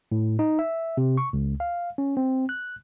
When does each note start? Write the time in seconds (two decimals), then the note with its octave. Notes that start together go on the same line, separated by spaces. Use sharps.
0.12 A2
0.39 D#4
0.59 E5
0.97 C3
1.17 C#6
1.33 C#2
1.60 F5
1.98 C#4
2.17 C4
2.49 F#6